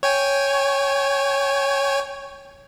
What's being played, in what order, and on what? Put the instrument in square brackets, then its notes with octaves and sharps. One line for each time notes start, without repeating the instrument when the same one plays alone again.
[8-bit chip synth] C#5 G5 G#5